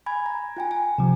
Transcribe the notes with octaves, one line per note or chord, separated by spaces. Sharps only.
G#5 B5 G#6
A#5
F4 G5 G#5
G#5
C3 F3